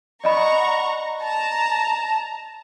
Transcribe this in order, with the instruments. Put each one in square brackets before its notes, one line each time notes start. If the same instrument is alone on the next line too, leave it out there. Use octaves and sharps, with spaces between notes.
[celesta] D5 D#5 B5 [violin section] F#5 A#5 C#6
[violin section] A5 A#5